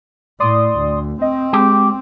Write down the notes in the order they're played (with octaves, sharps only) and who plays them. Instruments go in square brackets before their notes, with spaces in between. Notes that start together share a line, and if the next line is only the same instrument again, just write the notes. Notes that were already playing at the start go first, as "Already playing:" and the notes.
[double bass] A2 [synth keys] D5 C6 D#6
[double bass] D2
[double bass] C4 [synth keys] D#5
[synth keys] G#3 [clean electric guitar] G4